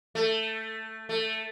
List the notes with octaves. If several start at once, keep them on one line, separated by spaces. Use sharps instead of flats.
A3
A3